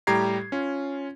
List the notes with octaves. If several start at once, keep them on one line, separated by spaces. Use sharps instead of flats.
A2 G3 G4 A#5 G#6 C7
C#4 F4